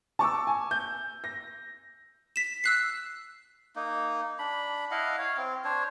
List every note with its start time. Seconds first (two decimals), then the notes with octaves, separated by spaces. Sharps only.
0.19 A5 C#6 D6 E6
0.47 G#5
0.71 G6
1.24 A#6
2.36 B6 E7
2.64 E6 F#6 C7
3.76 A#3 D#4
4.39 D4 B5
4.91 E4 D#5 F5 F#5
5.18 C#5 F5
5.37 C4
5.65 D4 C5 C#5